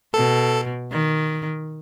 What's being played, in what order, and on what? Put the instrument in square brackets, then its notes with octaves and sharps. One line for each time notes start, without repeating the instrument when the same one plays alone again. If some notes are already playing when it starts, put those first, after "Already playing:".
[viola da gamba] B2 [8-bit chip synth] A4
[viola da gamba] D#3